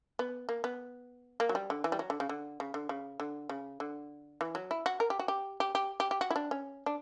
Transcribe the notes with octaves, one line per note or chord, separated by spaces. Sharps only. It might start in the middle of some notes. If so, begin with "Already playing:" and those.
B3
A#3
B3
A#3
F#3
G3
D3
E3
G3
F#3
D3
C#3
D3
C#3
D3
C#3
D3
C#3
D3
E3
F#3
E4
F#4
A#4
G4
F#4
G4
G4
G4
G4
G4
F#4
E4
D4
C#4
D4